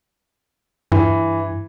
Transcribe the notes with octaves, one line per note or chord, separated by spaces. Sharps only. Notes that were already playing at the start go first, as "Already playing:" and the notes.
G2 E3